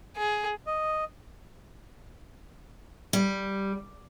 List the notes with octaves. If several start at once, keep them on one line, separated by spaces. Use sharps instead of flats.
G#4
D#5
G3